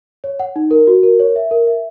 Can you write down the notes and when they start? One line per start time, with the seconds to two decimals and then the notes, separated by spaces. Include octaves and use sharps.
0.24 C#5
0.40 F#5
0.56 D#4
0.71 A#4
0.87 F#4
1.03 A#4
1.20 C#5
1.36 E5
1.51 A#4
1.67 E5